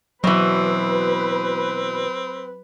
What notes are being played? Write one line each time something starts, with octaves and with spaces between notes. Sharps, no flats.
B2 E3 F#3 C4 B4